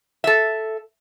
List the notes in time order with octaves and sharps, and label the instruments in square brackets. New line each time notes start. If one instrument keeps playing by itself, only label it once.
[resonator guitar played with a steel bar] A4 E5